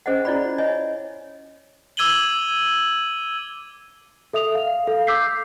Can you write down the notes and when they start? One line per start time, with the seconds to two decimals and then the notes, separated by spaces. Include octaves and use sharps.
0.06 C#4 G#4 C5 D#5 E5 F#5
0.25 C#4 E4 F4 D5 F#5 B5
0.58 C#5 D#5 E5 G#5
1.97 D6 E6 G#6 D#7 F#7 G7
4.33 A4 E5 D#6 F7
4.55 F5
4.87 A4 F5
5.07 D6 E6 G6 B6 C7